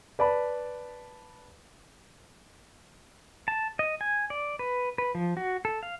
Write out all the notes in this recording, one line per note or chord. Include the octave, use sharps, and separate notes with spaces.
B4 D5 A5 B5
A5
D#5
G#5
D5
B4
B4
F3
F#4
A4
F5